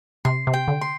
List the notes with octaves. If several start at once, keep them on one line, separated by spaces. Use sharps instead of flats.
C3 C6
C3
G5
D3
C6